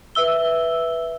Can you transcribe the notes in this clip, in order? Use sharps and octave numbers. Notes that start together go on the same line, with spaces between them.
B4 E5 E6 G7